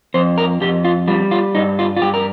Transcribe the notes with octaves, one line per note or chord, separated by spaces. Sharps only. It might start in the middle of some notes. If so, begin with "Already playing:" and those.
F2 C5
A#4
F2 G4
F4
G3 F4
F4
G2 D#4
F4
F4
G2 G4
A#4